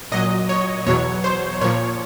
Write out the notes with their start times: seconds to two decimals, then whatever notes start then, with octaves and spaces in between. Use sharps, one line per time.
0.12 A#2 F#3 D#5
0.49 C#5
0.86 E2 B2 F#3 C#5
1.24 C5
1.61 A#2 F3 C#5